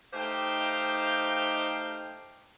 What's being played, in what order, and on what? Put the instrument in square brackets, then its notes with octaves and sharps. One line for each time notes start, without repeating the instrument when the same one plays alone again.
[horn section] A3 D#4 G4 C5 F5 G5